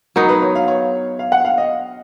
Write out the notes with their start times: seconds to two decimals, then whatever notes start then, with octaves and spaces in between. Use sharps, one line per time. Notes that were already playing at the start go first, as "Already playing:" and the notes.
0.16 F#3 B3 D#4 A#4
0.29 B4
0.42 C#5
0.55 F5
0.68 C#5
1.19 F5
1.32 F#5
1.45 F5
1.58 D#5